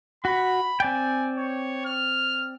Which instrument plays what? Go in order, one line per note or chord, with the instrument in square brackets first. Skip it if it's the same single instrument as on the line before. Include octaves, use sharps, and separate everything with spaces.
[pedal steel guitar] F#4 [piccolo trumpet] B5
[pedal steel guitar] C4 D5 G5 [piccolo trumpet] G#5
[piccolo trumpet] C#5
F6